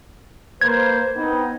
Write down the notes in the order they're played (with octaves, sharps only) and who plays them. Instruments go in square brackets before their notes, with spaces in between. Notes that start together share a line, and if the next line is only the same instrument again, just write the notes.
[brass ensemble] A#3 B4 C5 [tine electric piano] G#6
[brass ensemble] B3 C4 D#4